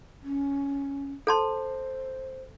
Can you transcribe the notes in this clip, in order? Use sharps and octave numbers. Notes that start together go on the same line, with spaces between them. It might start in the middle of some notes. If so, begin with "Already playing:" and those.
C#4
A4 C5 A5 C6